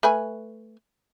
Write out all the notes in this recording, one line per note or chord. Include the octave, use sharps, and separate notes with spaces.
A3 B4 G#5